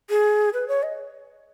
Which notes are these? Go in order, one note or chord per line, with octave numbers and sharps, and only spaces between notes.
G#4
B4
C#5
D#5